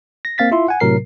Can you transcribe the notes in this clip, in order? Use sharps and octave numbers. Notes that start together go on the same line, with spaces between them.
A#6
A#3 C4 F5 A6 B6
E4 F4 E5 C6
F#5 G#5
A2 C3 F#3 A#4 C7